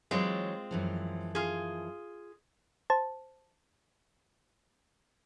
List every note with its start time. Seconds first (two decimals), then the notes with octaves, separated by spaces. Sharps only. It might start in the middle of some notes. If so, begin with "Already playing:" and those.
0.11 E3 F#3 G#3 C4 F4 C#5
0.71 F#2 E3 F3
1.35 F4 G#4
2.90 C5 A5